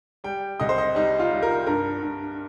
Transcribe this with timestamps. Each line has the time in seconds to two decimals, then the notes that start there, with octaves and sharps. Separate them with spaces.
0.24 G3 G5
0.60 C2 D#5
0.69 C5
0.78 D#5
0.95 G3 D#4
1.20 F4
1.31 G3
1.42 A#4
1.66 G2 A#4
2.02 G2